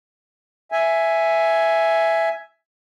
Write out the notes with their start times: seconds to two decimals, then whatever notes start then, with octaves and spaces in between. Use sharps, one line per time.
0.72 E5 G#5